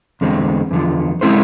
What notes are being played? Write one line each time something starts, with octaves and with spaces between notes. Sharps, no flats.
E2 D3 G#3 C4
E2 D3 F3
G#3 C4 E4 A4 C5